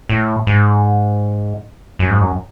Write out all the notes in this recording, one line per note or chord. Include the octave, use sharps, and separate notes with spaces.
A2
G#2
F#2
G#2
F#2